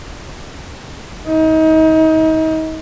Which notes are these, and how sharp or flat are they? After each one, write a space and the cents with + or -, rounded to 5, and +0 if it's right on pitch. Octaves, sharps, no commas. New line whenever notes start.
D#4 +30